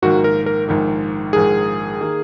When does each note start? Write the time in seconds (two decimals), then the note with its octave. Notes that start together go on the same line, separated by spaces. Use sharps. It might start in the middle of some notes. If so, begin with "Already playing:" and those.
0.02 A#1 G#2 D#3 A#3 F#4
0.24 A#4
0.46 A#4
0.68 A#1 G#2 D#3 A#3
1.33 A#1 G#2 D#3 A#3 G#4
2.01 D#3 A#3